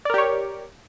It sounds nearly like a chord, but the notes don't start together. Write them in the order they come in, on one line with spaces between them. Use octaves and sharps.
D5 A#4 G4 C#5